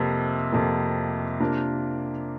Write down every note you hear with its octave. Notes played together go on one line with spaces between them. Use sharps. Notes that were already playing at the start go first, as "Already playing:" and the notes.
Already playing: F2 C3 A#3
F2 C3 A#3
C3 A#3 D4 F4 A#4